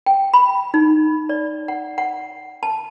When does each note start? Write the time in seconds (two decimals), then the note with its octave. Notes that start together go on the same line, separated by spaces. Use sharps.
0.06 G5
0.34 B5
0.74 D#4
1.29 D5
1.68 F#5
1.98 F#5
2.63 A5